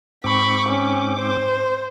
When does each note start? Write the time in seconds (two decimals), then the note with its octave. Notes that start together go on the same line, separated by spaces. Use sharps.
0.24 G#2 C4 B5 C#6 D6
0.69 C#4
1.20 C5